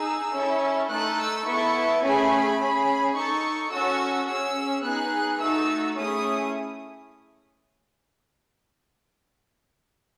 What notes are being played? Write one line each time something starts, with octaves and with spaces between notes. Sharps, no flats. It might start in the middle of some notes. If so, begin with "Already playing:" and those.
Already playing: D#4 G#4 E6
C#4 E4 A4
A3 D#4 A4 F#6
E6
B3 E4 A4 C#6
A3 C#4 G#4 B5
C#4 G#4
D#4 A4 C#6
C#4 F#4 A4 E6
C#4 G#4 E6
B3 D#4 G#4 F#6
A3 D#4 F#4 A4 E6
A3 C#4 E4 G#4 D#6